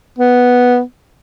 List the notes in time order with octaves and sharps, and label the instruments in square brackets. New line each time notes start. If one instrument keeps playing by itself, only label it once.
[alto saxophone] B3